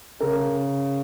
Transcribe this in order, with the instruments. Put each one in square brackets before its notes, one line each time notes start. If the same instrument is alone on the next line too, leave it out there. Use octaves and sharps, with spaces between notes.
[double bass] C#3 [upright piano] A#4